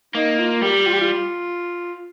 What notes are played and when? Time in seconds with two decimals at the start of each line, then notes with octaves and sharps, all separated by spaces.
0.15 A#3 D#4
0.39 F4
0.62 G3 G4
0.87 F4
0.93 G4
1.00 F4